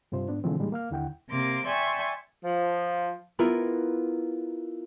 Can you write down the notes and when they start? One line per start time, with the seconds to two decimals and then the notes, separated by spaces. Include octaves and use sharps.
0.12 G2 C3 F4 C5
0.28 G#2 B3 D4
0.44 B2 D3 E3 F3 G#3 C4
0.59 A2 D#3 G3 G#3 A#3
0.72 A#3 F5 F6
0.91 D#2 D3 E4 F#5 G5
1.30 C3 A#3 C6 D6
1.66 D5 E5 G5 G#5 C6 C#6
2.44 F3
3.39 B3 E4 F4 A#4